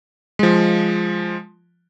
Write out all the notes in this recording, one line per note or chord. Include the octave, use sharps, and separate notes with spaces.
F3 G#3